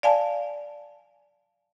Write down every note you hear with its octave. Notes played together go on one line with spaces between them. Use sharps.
D5 F5 G#5 A5